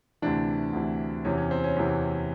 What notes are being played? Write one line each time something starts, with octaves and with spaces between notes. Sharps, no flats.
D2 C3 E3 D4
D2 C3 E3
E2 C3 E3 C#4
C#4
C4
C#4
E2 C3 E3